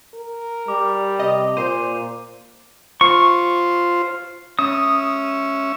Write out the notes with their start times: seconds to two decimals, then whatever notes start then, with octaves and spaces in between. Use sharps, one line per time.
0.15 A#4
0.68 G3 D6
1.19 C3 D#5
1.57 A#2 A#4 C5 D#7
3.01 F4 C5 C#6
4.59 C#4 E5 D#6